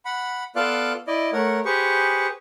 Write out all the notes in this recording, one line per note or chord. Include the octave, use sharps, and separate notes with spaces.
F#5 B5
B3 F4 A4 D5 F5 F#6
E4 D5 D#5
A3 A#4 C#5 F#5
G4 G#4 B4 C5 C#6